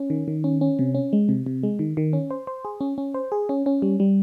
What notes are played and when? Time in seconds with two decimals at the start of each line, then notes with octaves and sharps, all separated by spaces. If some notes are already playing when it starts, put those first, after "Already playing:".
Already playing: C#4
0.10 D#3
0.28 D#3
0.44 C#4
0.61 C#4
0.79 C3
0.95 C#4
1.13 G#3
1.29 C3
1.46 C3
1.63 G#3
1.79 D#3
1.97 D#3
2.13 C#4
2.31 C5
2.47 C5
2.65 G#4
2.81 C#4
2.98 C#4
3.14 C5
3.32 G#4
3.49 C#4
3.66 C#4
3.82 G3
4.00 G3